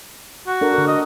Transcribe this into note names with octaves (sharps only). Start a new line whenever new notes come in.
F#4
D4 A4 A#4
D3 A#4
D#5